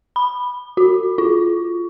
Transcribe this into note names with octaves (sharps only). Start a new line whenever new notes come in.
B5
F#4
F4